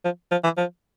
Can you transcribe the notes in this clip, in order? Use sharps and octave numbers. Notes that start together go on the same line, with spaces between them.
F3
F3
E3
F3